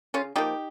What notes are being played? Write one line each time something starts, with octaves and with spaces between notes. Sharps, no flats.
C#3 C#4 F4
F3 A#3 D#4 G4